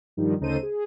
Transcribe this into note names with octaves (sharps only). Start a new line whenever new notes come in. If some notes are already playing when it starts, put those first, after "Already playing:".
G2 D#3 F3 G3 D#4
D2 C#3 D#4 A4 C5 D#7
G#4